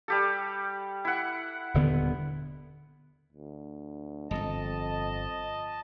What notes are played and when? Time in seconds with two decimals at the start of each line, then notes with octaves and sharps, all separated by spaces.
0.08 G3 G4 A4
1.05 E4 F#5
1.74 D#1 D3 B3
3.33 D2
4.31 D1 G1 F2 D#5 A5